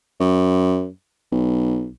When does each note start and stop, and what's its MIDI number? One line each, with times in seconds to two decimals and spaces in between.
0.20 0.88 42
1.32 1.89 35